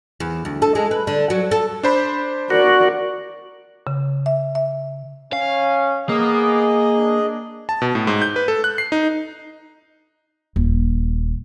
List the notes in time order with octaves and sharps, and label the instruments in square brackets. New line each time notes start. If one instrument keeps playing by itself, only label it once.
[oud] E2
D2
A4
G#3
B4
D3
F#3
A4
[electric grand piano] D4 C5 B5
[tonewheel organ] F#4 [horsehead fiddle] A#4 D5
[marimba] C#3
E5
E5
[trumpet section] C#4 [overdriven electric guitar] F5
[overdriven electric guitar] A#3 [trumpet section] B3 D6 D#6 [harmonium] G#4 D#5
[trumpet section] D4
[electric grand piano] A5
B2
A2
G#2
G6
B4
A4
F#6
C7
D#4
[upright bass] D#1